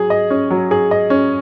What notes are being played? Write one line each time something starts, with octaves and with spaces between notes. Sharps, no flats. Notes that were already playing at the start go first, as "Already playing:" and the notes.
Already playing: F#3 G#4
D#5
C#4
F#3
G#4
D#5
C#4